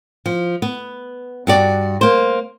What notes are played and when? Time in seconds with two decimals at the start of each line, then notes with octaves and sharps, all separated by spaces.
0.26 F3
0.62 B3
1.47 G2 F#4 D5
2.01 A#3 C5